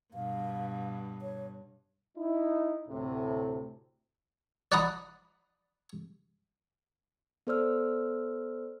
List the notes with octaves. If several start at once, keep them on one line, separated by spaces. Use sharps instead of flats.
G2 B2 F5
C#5
D#4 E4
D2 A2 C3
D5 F#5 A#5 B5 D#6
B3 A4 C5 D5 E6 F6